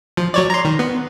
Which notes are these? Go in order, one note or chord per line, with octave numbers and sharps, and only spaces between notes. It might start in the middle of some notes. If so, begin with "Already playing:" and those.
F3
F#3 C#5 D5
A#5 C6
D#3
B3